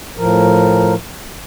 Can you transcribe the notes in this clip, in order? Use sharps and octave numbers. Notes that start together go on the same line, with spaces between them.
A2 F3 A#4